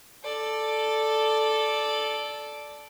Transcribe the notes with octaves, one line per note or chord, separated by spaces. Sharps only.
A4 D5